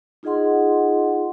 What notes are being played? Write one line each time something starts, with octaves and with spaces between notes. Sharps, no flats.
D#4 F4 G#4 D#5 F#5 C6